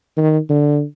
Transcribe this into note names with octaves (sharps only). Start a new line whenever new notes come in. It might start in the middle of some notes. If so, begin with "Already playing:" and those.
D#3
D3